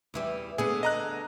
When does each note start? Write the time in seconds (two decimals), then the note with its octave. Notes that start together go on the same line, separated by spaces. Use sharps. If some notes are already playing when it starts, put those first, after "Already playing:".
0.14 E2 E3 G3
0.58 D3 B3 G#4
0.83 D#5 A#5 F#6